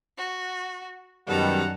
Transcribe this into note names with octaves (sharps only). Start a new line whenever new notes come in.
F#4
F#2 B2 D#3 G3 A4 F#5 A#5